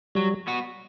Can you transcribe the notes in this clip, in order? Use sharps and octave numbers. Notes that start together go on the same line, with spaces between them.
F#3 G3
B3 F#4